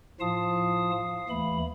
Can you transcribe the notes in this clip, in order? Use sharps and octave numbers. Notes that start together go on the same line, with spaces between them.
A2 F3 F4 F5 A5 D#6
F5
D#2 E3 A3 B5